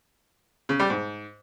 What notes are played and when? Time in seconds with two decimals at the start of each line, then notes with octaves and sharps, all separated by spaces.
0.69 C#3
0.79 G3
0.90 G#2